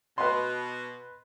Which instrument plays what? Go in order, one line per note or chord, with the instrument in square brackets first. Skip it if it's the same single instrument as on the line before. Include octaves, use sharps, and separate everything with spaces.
[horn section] B2 [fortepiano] B4 D#5 C6